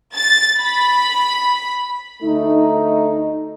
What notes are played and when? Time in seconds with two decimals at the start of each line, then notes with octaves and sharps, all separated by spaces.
0.17 A6
0.61 B5
2.23 D2 A3 D#4